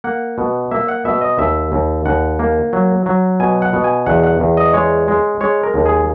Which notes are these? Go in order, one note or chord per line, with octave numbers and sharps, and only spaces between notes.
A#3 F#5
B2
A#3 E5
F#5
B2 E5
D#5
D#2 E5
D#2
D#2 F#5
A#3
F#3
F#3
B2 G#5
F#5
B2
G#5
E2 F#5
F#5
E2
D#5
G#3 C#5
G#3
G#3 C#5
A#4
D#2
G#4